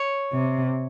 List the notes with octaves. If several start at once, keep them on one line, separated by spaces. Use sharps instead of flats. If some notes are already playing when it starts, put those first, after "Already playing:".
Already playing: C#5
C3